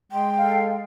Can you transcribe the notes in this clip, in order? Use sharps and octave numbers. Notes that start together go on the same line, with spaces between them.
G#3 G5 C6
A4 F5